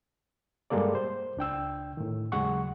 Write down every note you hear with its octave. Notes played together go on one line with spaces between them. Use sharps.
G2 G3 G#3 A#3 A4 D5
C5
C#2 D4 G5 E6
A2 D#3
D#2 C#3 F#3 G#3 F#5 C#6